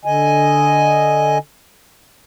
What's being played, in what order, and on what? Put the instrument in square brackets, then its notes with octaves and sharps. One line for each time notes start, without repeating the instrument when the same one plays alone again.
[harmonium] D3 D#5 G#5